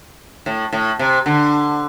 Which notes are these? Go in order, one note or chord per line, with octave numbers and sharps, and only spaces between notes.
A2
A2
C3
D3